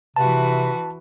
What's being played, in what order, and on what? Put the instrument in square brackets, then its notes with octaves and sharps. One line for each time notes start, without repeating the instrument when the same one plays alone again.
[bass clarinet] C3 [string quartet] E3 F#4 B4 [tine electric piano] A5